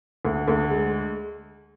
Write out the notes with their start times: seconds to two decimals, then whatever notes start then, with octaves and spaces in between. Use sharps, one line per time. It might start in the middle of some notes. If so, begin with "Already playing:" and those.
0.25 D2
0.48 D2
0.70 G#3